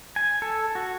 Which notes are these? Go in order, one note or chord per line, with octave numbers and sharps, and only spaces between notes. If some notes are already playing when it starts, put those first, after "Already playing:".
G#5
A4
F#4